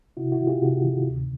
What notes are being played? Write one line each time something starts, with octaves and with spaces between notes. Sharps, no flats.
C3 E4 F#4
E4 F#4
D#3
F4 G4
C3 F#4 G#4
D#3
D2